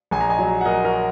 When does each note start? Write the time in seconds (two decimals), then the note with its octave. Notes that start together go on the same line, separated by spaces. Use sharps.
0.11 A#1 G#5
0.21 A#5
0.29 D#5 G#5
0.38 F#3
0.61 F#5
0.65 F#3 A#4 D#5
0.84 F#4 A#4